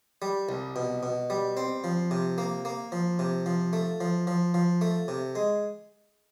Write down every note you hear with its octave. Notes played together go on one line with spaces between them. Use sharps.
G3
C2
B2
B2
G3
C4
F3
C3
A#3
A#3
F3
C3
F3
A3
F3
F3
F3
A3
C3
G#3